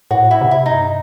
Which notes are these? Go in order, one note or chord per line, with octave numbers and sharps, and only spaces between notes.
A2 F#4
E4
C3
E4
D#4
G2